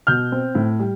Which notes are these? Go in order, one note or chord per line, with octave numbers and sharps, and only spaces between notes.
B2 F6 G6
C4
A2
G3